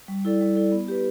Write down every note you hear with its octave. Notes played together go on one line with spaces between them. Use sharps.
G3
E4 A4 D5
G3
E4 A4 D5
B3
G4 B4